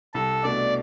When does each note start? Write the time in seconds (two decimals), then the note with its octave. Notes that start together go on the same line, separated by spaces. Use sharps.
0.14 C2 A4
0.43 B2 A3 D4 D5